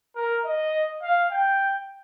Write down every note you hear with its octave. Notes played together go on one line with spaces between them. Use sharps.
A#4
D#5
F5
G5